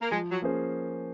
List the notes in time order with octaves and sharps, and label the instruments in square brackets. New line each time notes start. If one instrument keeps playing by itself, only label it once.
[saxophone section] A#3
[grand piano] F3 [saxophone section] G#3
[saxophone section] F#3
[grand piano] A#3 C#4 G#4 C5